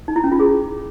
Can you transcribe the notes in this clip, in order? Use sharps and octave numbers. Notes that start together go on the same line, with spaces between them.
D#4
E4
C#4
F4
G#4